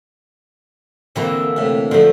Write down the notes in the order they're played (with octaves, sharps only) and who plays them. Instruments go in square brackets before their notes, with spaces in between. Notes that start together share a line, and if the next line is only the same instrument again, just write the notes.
[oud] D3 E3 A#3 [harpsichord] C4
[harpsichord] A2 C3
[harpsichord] D3 [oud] F3 A3